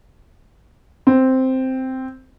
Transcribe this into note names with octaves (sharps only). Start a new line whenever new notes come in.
C4